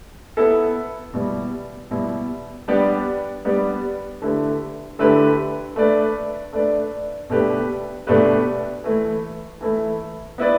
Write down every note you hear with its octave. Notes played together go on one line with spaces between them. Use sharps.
B3 E4 A4
B2 G3 E4
B2 G3 E4
G3 B3 D4 G4 D5
G3 B3 D4 G4 D5
D3 A3 E4 G4 B4
D3 A3 E4 G4 B4
A3 D4 B4 D5
A3 D4 B4 D5
B2 A3 D4 G4 B4
B2 A3 D4 G4 B4
E3 A3 E4
E3 A3 E4
B3 E4 B4 D5